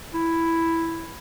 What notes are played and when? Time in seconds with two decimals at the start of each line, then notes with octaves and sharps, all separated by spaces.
0.14 E4